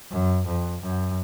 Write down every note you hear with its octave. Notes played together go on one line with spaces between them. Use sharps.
F#2
F2
F#2